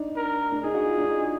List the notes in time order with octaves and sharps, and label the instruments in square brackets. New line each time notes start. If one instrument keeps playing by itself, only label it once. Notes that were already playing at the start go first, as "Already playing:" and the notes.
Already playing: [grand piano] D4 D#4
[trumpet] A#4
[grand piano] D4
[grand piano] D#4 [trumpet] G#4
[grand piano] F#4
F4
D4
D#4